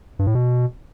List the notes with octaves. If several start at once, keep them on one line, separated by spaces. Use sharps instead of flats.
G2
A2
B2